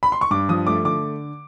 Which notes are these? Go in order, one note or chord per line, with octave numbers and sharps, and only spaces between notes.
B5
C6
C#6
G2 D6
F3 D#6
A3 D6
D3 D6